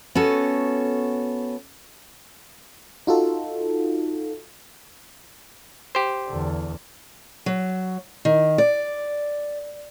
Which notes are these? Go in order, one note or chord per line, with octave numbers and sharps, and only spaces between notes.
B3 C#4 F#4 A4
D#4 F4 F#4 A4
G4 C5
E2 D3
F#3
D#3
D5